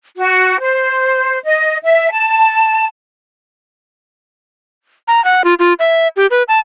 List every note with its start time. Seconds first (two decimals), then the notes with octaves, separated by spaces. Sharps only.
0.17 F#4
0.60 C5
1.44 D#5
1.83 E5
2.12 A5
5.08 A#5
5.25 F#5
5.44 F4
5.59 F4
5.79 E5
6.17 G4
6.31 B4
6.48 A5